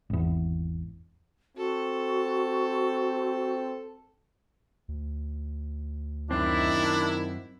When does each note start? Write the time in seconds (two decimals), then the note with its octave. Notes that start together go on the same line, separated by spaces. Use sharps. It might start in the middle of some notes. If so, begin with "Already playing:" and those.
0.10 G#1 E2
1.57 C4 F#4 A4
4.88 D2
6.31 F#2 D#3 C4 D4 E4